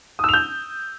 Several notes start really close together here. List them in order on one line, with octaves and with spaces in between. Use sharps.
D#6 E6 F7 G6